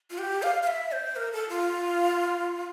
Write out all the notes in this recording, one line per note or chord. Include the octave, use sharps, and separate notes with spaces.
F4
G4
F5
F5
E5
C5
A#4
A4
F4